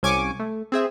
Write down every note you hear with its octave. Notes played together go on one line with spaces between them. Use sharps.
C2 C#4 G#5 C#6 D6
A3
C4 G#4 E5